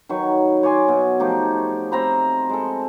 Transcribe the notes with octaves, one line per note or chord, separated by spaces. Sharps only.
D#3 F#3 B4 C#6
C#5 D5 G#5 C6
B2
F3 A3 D#4 G4
C4 A#5 B5
G#3 A4